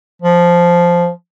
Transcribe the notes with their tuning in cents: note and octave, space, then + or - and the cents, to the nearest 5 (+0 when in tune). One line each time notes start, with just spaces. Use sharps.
F3 -5